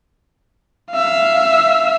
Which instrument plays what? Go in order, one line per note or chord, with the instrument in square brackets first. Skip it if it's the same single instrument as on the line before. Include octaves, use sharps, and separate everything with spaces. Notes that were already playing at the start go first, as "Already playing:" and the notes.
[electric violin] E5 F5